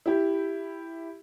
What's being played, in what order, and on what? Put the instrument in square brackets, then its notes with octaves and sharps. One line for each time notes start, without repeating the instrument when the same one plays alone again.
[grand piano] E4 G4